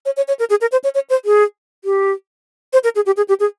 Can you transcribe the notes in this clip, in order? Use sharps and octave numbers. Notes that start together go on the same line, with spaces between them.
C#5
C#5
C#5
A#4
G#4
A#4
C5
C#5
C#5
C5
G#4
G4
C5
A#4
G#4
G4
G#4
G4
G#4